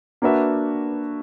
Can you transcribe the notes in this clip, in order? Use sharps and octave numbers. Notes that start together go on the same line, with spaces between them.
A#3 D4 F#4 B4 E5